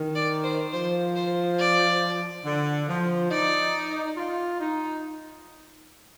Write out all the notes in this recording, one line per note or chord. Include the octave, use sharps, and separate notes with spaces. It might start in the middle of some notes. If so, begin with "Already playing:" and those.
Already playing: D#3
D5
C5
F3 C5
C5
D5
D3
F3
D#4 D5
F4
D#4